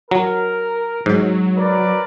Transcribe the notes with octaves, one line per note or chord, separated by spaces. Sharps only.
F#3 A#4
G#2 F#3
A#4 B4 D5